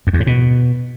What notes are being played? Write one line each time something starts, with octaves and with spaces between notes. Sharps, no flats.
F#2
E2
G#2
B2